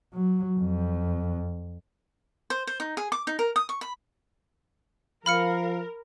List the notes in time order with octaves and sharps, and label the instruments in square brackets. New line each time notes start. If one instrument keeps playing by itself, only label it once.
[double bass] F#3
F2
[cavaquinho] C5
C5
D#4
G#4
D6
D#4
A#4
D#6
C#6
B5
[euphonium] F3 [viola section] A#4 [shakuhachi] F5 [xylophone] B5 F6 C#7